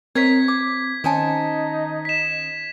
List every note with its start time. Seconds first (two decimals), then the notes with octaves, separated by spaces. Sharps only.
0.15 C4 A#4 C#5 D#5 G#6 B6
0.48 D6
1.04 D#3 C#4 D#4 C5 G#5 A5
2.05 B6 E7